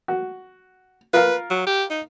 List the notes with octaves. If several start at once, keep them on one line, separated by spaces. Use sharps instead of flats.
F#4
F4 A#4 B4 F5
F#3
G4
D#4